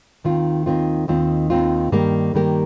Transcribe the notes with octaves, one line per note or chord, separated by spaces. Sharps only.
D#2 D#3 C4 F4
D#2 D#3 C4 F4
D#2 D#3 C4 F4
D#2 D#3 C4 F4
G2 D#3 A#3 G4 A#4
G2 D#3 A#3 G4 A#4